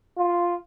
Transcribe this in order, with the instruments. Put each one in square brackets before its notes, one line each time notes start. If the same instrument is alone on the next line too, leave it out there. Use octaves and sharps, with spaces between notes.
[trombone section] F4